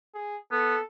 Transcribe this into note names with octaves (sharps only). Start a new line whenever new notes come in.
G#4
B3 A4